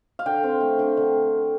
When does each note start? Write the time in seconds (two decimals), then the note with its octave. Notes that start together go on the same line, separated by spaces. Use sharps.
0.19 F5
0.26 D3 G5
0.43 C4
0.61 A3
0.79 D3
0.97 D3